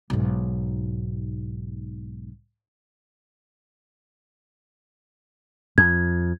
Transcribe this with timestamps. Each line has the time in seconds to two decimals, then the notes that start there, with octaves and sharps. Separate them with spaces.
0.10 B1 G#2
5.78 F2 G#6